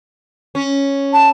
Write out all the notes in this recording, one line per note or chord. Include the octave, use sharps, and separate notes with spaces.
C#4
A5